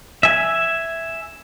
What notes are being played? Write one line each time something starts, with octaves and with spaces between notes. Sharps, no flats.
E5 G#5